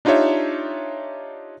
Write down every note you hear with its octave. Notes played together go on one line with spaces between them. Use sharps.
D4 D#4 F4 G4 C#5 E5